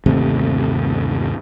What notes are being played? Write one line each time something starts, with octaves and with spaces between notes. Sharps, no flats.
G1 D#2 C3 A3